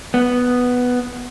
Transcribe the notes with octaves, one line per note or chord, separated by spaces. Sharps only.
B3